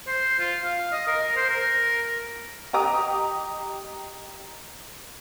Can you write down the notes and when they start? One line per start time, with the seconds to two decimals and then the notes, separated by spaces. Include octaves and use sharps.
0.07 C5
0.39 F4
0.64 F5
0.92 D#5
1.07 A#4
1.36 C5
1.50 A#4
2.73 G4 D#5 A#5 D6 D#6